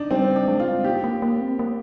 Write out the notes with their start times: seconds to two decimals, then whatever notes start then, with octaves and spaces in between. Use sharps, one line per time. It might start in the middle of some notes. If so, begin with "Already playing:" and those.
Already playing: D4 D#4
0.11 G3 C4
0.36 D4
0.48 G#3
0.60 F4
0.77 C4
0.84 A#3 G4
1.04 A#3
1.22 A#3
1.41 C4
1.59 A#3